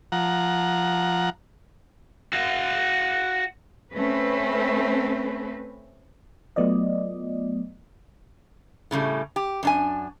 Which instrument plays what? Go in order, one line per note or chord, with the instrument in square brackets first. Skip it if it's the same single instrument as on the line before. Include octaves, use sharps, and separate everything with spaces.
[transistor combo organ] F3 F#5 A#5
[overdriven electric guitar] F#4 F5
[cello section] A3 C4 C#4 B4
[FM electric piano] F#3 A3 B3 F4 D5 D#5
[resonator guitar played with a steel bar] A2 C#3 G3 A3
G4
F#2 D4 G#5